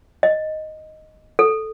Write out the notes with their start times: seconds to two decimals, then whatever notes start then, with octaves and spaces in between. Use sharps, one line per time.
0.23 D#5
1.39 A4